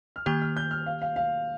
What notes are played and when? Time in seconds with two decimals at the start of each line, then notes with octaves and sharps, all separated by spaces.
0.16 F6
0.26 D#3 A#3 G4 G6
0.42 F6
0.57 G6
0.71 F6
0.86 F5
1.02 F5
1.16 F5